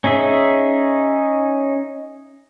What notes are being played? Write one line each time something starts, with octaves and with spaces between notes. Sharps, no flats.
C#4 D#4 G#4 E5